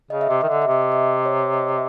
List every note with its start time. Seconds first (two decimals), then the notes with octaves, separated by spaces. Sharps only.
0.10 C#3 D#5
0.21 E5
0.29 C3 D#5
0.41 D#3 E5
0.48 D3 D#5
0.62 E5
0.67 C3 D#5
0.82 E5
0.92 D#5
1.25 C#5
1.39 C#5
1.53 D#5
1.68 E5